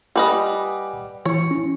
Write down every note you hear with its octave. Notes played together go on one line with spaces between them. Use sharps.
G3 B4 D#5 F#5 G#5 D6
E3 E4 C#5
C#4 E4